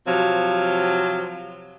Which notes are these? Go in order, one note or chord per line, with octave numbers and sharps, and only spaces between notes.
C3 F3 F#3